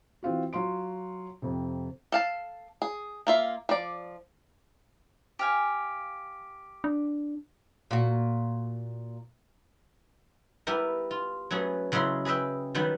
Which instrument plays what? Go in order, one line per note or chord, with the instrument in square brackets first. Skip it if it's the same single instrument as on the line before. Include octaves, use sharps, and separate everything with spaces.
[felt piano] E3 C4 F4 F#4
F#3 F4 C6 D7
F2 C3
[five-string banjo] A4 F5 A5
G#4
A#3 F4 E5
F3 D5
[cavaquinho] G4 F5 G#5
[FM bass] D4
[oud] A#2 F#4
[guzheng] G3 B3 E4 G4 A#4
F4
F#3 A3 B3 C#4 G#4
C#3 F#3 G#3 E4 B5 C6
G#4 B4 D#5 E5 G5
D#3 F#3 G3 B3